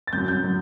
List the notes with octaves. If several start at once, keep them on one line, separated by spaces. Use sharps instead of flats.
A6
F#2 F#3 G6
G6
F#3